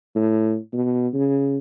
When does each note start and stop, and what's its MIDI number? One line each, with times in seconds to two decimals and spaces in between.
0.15 0.57 45
0.73 1.08 47
1.13 1.58 49